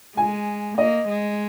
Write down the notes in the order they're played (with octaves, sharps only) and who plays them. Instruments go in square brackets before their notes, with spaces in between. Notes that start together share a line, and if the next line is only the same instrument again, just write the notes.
[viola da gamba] G#3 [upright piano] G#5
[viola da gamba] A#3 [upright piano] D#5
[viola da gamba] G#3